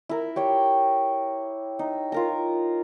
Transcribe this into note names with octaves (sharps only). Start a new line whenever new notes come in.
E4 A#4
G4 C#5 G5
D#4
F4 A#4 A#5